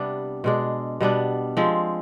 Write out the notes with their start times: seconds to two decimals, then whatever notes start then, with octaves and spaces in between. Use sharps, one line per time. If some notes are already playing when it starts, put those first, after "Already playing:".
Already playing: C3 G3 B3 D4
0.44 B2 G#3 D4
1.00 B2 G3 B3 D4
1.57 F3 G#3 C4